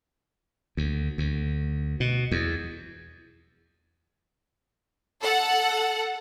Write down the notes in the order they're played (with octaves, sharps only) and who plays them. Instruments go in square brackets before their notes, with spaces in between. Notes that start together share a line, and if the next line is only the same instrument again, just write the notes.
[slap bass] D2
D2
B2
E2
[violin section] A4 F#5